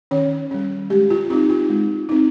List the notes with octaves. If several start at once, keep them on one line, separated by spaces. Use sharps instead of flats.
D#3 C#4 C#5
G3 C#4
G#3 G4
F4
C4 D#4 F4
F4
G#3
C4 D#4